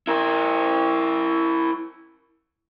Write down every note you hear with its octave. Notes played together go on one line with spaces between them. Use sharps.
E4 A#4